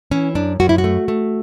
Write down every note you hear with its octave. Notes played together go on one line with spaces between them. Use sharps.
E3 C#4
F#2 D4
F#2 F#4
E4
F#4
A3
A3